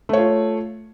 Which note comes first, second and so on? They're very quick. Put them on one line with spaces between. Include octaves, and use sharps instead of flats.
A3 C#5 F4